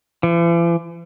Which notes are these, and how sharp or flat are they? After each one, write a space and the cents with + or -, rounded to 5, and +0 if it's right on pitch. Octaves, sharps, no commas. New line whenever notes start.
E3 +45